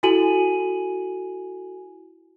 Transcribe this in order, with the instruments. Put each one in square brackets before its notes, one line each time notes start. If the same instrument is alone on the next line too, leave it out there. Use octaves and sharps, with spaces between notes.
[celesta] E4 F#4 A4 G#5 D#7 F#7